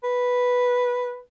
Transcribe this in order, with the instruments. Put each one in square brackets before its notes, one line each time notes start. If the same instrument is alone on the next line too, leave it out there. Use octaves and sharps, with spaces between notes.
[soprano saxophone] B4